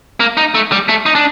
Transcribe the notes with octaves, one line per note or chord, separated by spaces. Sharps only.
A#3
D#4
A3
G3
A3
D#4
D4